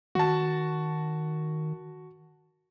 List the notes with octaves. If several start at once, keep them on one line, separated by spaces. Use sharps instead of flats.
D#3 F#4 A5